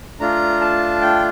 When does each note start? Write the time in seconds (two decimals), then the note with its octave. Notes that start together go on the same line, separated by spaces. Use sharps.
0.20 A3 D4 F4 A#5
0.61 A5
1.01 G5